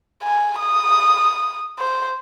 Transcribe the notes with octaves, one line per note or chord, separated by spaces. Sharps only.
G#5
D#6
C5